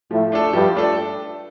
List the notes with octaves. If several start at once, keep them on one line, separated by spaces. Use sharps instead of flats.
A2 F3 A3
A3 D4 A4
G2 F3 G3
A3 D4 A4